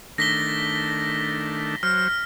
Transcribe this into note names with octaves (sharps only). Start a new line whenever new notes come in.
D#3 A3 D4 A#6 B6 G7
F#3 C5 F6